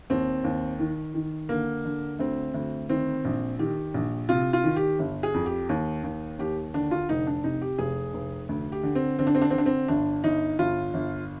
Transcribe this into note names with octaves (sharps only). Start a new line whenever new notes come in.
D#2 C4
D#2
D#3
D#3
D3 A#3
D3
D2 C4
D2
D#3 C4
A#1
D#3 G4
A#1
C3 F4
F4
D#3
G4
G1
G#4
F2
G4
D#2
D#2
D#2 G4
D3 D4
F4
F1 D#4
D4
C3 D#4
G4
F1 G#4
F1
D2
G4
D3
C4
D3 C4
D4
C4
D4
D3 C4
D4
C4
G1 D4
G1 D#4
G1 F4
G1